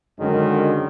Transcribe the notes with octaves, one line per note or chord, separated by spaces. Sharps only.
F#2 D3 D#3 G#3